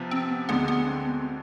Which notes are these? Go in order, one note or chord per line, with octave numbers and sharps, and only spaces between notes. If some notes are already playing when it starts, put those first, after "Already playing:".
Already playing: C3 F3 B3
C4
B3
D2 D3 G#3 B3 D4
B3
C4
B3